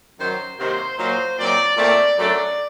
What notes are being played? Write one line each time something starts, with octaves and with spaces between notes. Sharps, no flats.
F#2 D#3 F#3 C5
C3 D#3 F#3 A#3 C5
A#2 F#3 A#3 D#4 C5
A#2 F#3 C4 D#4 D5
A#2 A3 C4 D5
F#2 F#3 A3 D4 D5